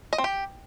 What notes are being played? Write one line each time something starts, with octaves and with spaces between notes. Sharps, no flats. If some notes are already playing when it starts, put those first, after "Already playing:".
D#5
C4
G4